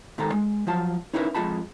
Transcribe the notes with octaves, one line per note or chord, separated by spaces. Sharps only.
G#2 D#3 G#3 A4 A#5
G#3
F3 F#3 F4 A5
C#4 D#4 E4 G4 A#4 B4
F2 G#3 F4 A5 B5